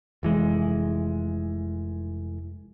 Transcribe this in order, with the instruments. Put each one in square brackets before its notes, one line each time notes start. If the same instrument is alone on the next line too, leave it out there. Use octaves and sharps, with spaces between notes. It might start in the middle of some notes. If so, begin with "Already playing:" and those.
[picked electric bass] F1 E3 G#3